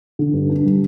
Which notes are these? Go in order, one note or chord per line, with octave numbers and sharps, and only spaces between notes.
D3
G2
D4
G3